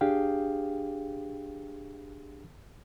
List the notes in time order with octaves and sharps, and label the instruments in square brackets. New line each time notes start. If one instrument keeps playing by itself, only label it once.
[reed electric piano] D4 G4 G#4 F5 G5